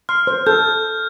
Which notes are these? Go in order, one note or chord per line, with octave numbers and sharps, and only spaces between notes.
C6 F6
C5
A4 G6